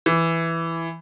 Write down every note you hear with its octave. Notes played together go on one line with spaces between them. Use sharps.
E3